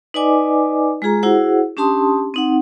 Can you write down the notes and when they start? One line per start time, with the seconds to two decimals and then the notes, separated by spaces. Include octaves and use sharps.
0.14 D#4 B4 D5 D#5 G#5 D6
1.02 G#3 F4 G#4 A#5
1.23 E4 F#4 G#4 C5 F#5
1.77 C#4 D4 G4 A5 C6 D#6
2.34 C4 D#4 F#5